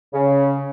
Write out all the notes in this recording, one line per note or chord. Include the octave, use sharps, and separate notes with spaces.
C#3